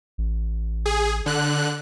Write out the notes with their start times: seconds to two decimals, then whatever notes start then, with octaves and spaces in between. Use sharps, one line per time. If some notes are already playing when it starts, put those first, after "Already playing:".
0.18 A1
0.86 G#4
1.26 D3 F#6